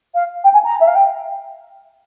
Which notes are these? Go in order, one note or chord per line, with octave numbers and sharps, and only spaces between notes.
F5
G5
G#5
A#5
E5
F5
G5